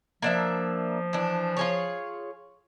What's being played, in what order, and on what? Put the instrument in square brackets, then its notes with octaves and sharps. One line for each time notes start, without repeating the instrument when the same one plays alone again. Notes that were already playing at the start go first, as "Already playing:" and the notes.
[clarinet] F3 [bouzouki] A#3 D4 E5
[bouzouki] E3 D4
F4 G#4 C#5